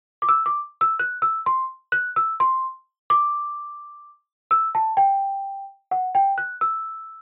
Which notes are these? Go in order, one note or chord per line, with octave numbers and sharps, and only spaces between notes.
D6
E6
D6
E6
F#6
E6
C6
F#6
E6
C6
D6
E6
A5
G5
F#5
G5
F#6
E6